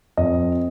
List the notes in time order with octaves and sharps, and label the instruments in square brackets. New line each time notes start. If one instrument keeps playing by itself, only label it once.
[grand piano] F2 D#5